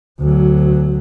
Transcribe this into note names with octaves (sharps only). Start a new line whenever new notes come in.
D2 F#3